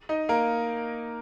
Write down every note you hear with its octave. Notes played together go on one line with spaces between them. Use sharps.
D#4 D#5
A#3 A#4